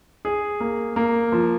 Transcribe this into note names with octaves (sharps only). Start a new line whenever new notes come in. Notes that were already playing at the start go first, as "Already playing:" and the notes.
G#4
A#3
A#3
F3